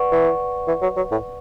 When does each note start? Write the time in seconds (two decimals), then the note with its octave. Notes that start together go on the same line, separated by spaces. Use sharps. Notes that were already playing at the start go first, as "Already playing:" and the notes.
Already playing: B4 D5 F#5 C#6
0.12 E3
0.68 E3
0.82 F#3
0.96 F#3
1.11 A2